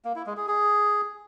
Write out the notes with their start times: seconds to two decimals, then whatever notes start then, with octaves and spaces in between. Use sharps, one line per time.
0.05 A#3
0.16 E4
0.26 G#3
0.37 G#4
0.48 G#4